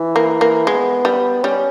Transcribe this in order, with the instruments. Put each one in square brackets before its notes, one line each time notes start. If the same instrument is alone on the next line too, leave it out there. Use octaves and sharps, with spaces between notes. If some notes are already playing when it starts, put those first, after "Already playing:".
Already playing: [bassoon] E3
[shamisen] A#3
A#3
[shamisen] G#3 [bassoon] B3
[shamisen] G3
[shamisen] G3 [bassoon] C#4